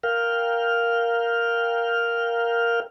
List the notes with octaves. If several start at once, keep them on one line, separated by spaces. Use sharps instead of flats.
A#4 F5 G5 F6